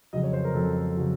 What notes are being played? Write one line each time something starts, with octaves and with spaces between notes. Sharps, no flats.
F2 C#3 F#3 D#5
C#5
C5
A#4
F2 C#3 F#3 A4
C#3 F#3